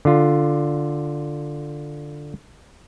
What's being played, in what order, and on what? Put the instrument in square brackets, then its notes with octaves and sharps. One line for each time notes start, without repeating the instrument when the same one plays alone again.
[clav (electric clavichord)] D3 F4